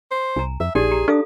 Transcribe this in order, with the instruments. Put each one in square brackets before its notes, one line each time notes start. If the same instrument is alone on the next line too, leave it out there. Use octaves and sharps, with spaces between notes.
[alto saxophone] C5
[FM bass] C2 [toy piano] G#5 A#5
[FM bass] F2 [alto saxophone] E5
[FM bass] A#1 [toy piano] D#4 G4 D5 [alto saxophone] G#4
[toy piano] G4 A#5
[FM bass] D4 [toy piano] A4 F5 D#6